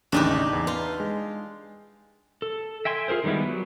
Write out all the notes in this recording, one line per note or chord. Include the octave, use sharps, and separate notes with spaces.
A1 D#2 C#3 D4 D#4 G4
E2
F4 B4
G#3
A4
E5 G5 G#5 C6
F4 G#4 A#4 C5
D#3 G3 G#3 B3 E4
F#3